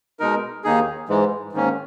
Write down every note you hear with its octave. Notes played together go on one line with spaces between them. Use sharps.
B2 G#3 D#4 A#4
D#2 D#3 A#3 D#4 G#4
G#2 E3 G#3
G#2 D#3 A#3 C#4